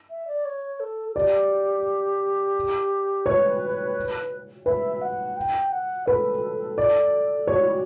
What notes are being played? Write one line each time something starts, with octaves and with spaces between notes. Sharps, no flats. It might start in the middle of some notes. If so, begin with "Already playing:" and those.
E5
D5
C#5
A4
A4
G4 D5
B4 C#5
B4 E5
F#5
G5
F#5
A4 B4
D5
G4 C#5
F#4
E4
F#4